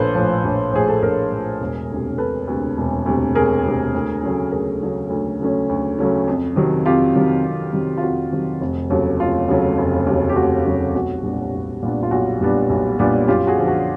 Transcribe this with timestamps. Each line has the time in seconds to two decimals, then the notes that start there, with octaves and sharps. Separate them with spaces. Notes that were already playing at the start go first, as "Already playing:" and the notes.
Already playing: A#1 A2 F3 A4 B4 C5
0.15 A2 F3
0.44 A#1
0.73 A2 F3 G#4
0.89 A4
1.02 A#1 G#4 A#4
1.32 A2 F3
1.60 E1
1.90 D2 C3
2.18 E1 A4 B4
2.47 D2 C3
2.78 E1
3.06 D2 C3
3.35 E1 G#4 A#4
3.64 D2 C3
3.95 D2
4.23 C#3 F#3 A3 C#4
4.52 D2 G#4 A#4
4.81 C#3 F#3 A3 C#4
5.10 D2
5.40 C#3 F#3 A3 C#4
5.69 D2
5.99 C#3 F#3 A3 C#4
6.27 F2
6.56 C3 D#3 F#3
6.86 F2 F4 G4
7.15 C3 D#3 F#3
7.45 F2
7.73 C3 D#3 F#3
7.98 F4
8.02 F2 F#4
8.32 C3 D#3 F#3
8.61 F1
8.90 D#2 C#3 F#3 A3
9.20 F1 F4
9.48 D#2 C#3 F#3 A3
9.78 F1
10.06 D#2 C#3 F#3 A3
10.29 G4
10.36 F1 F#4
10.65 D#2 C#3 F#3 A3
10.95 B1 F#4
11.23 A#2 G3 B3 D4
11.52 B1
11.83 A#2 G3 B3 D4
12.03 F4
12.11 B1 F#4
12.41 A#2 G3 B3 D4
12.70 B1
12.99 A#2 G3 B3 D4
13.28 F#2 F4 G4
13.47 F#4 G#4
13.57 D3 F3
13.68 F#4